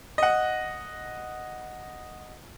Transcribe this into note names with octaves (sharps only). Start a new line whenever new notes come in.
D#5 F#5